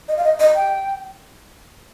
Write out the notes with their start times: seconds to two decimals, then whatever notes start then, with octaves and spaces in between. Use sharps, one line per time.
0.08 D#5
0.17 F5
0.24 D#5
0.40 D#5
0.55 G5